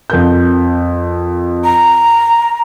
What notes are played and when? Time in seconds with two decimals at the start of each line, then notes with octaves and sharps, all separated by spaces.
0.10 F2 A#4 G6
1.64 A#5